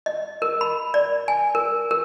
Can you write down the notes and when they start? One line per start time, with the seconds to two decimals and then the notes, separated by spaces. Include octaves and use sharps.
0.06 D#5
0.42 A#4
0.61 B5
0.94 D5
1.28 G#5
1.55 A#4
1.91 A#4